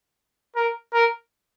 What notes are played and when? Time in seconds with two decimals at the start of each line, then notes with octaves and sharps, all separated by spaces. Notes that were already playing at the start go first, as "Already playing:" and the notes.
0.56 A#4
0.94 A#4